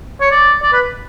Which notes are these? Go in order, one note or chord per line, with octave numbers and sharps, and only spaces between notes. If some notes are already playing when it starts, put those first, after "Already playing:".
C#5
D5
D5
B4